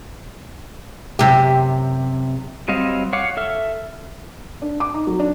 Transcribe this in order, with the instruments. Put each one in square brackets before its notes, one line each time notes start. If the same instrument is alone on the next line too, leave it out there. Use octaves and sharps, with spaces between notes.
[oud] F#2 C3 G4
[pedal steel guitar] F#3 G3 C4 D#5 F5
C#5 F5 F#5 D6
A4 E5 F6
[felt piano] D4
D6
D#4
F#3
D4